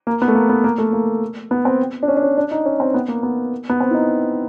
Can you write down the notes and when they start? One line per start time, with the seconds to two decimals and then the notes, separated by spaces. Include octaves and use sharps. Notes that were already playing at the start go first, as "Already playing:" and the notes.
0.07 A#3
0.22 B3
0.28 A3
0.35 A#3
0.49 B3
0.64 A#3
0.78 A3
0.93 A#3
1.51 B3
1.65 C4
2.03 D4
2.08 C#4
2.17 D4
2.23 C#4
2.37 D4
2.51 D#4
2.66 C#4
2.80 C4
2.94 B3
3.08 A#3
3.23 B3
3.70 B3
3.80 C4
3.91 E4
3.94 D#4